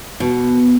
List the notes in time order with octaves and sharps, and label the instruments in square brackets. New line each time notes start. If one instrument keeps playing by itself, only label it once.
[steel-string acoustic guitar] B2